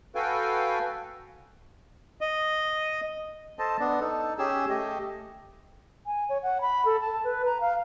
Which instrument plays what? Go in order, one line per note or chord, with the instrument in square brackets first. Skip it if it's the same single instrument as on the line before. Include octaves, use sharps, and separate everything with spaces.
[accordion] F#4 A4 B4 F5 G5 G#5
[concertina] D#5
[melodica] A4 C5 D#5 A5
B3 D4
D#4 A4
C#4 G4 G#4 E6
A3 G4 D#5
[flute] G#5
C#5
F#5
B5
A4
A5
B4
A#5
F5